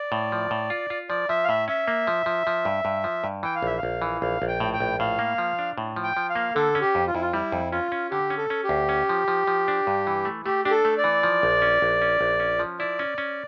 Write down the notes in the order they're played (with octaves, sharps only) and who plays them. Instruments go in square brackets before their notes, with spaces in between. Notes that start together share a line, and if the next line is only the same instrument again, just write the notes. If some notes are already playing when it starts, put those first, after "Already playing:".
Already playing: [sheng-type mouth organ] D5
[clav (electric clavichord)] A2
F3
A2
F4
F4
[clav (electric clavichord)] F3 [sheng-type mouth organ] D5
[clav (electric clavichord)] F3 [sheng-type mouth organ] E5
[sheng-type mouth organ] F5
[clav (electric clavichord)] A2 [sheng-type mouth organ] E5
[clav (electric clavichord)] C#4 [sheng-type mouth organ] E5
[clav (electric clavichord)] A#3
F3
F3
F3
G2
G2
F3
G2
[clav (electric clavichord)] E3 [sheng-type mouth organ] G5
[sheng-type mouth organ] F5
[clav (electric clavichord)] A#1 [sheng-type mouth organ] E5
[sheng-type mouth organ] F5
[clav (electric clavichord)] A#1
E3
[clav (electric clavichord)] A#1 [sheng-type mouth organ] F5
[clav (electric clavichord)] A#1
[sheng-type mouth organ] G5
[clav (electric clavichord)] A2
[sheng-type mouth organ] G5
[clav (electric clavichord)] A#1
[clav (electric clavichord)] A2 [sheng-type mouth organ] F5
[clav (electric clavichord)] A#3
F3
D4
A2
F3
[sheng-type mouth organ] G5
[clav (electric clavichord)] F3
[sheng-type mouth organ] F5
[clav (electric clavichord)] A#3
[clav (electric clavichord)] D3 [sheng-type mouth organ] A4
[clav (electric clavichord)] C#4
[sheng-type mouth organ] G4
[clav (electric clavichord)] F2
[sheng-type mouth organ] F4
[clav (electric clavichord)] F2 [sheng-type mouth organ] E4
[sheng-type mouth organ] F4
[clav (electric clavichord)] G3 [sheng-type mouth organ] E4
[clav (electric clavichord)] F2
[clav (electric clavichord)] C#4 [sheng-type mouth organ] F4
[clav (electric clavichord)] C#4
[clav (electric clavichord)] D3 [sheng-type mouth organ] G4
[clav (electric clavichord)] C#4
[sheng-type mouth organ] A4
[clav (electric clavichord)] C#4
[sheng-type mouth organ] G4
[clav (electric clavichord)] D2
C#4
F3
F3
F3
D4
G2
E3
A3
[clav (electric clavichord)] A3 [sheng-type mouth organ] G4
[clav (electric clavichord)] D4 [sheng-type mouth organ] G4
[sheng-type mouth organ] A4
[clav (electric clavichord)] A3
[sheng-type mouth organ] D5
[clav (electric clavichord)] E3
F3
A#1
C#4
A#1
C#4
A#1
C#4
F3
[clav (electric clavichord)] E4 [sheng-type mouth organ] D5
[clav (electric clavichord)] C#4
C#4